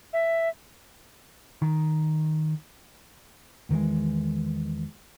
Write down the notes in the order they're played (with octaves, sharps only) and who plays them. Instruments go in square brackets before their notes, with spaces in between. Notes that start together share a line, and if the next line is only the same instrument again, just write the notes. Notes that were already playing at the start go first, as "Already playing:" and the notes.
[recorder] E5
[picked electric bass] D#3
[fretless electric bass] E2 D#3 E3 G#3